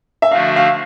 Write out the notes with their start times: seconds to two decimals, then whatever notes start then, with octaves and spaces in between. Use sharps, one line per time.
0.22 E5
0.31 D3 F3 A3 D4 F#4 F5
0.56 F5